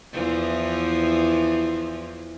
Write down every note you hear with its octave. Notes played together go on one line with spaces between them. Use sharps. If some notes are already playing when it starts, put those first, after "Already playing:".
E2 E3 F3